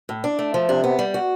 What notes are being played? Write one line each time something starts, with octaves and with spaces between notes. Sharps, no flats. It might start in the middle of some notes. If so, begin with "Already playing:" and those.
A2
D4
A3
F3
C3 D4
B3
G3
F#4